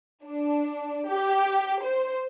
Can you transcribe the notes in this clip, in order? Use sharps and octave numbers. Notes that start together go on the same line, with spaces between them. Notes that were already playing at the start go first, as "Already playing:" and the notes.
D4
G4
C5